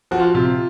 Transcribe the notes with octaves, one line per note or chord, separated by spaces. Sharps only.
F3 F#4
F4
C3 F4